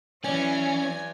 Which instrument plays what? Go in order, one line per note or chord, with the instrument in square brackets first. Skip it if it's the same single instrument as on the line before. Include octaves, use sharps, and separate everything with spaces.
[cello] E3 F#3 [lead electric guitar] C#4 [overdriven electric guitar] B4 D5 [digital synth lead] G#5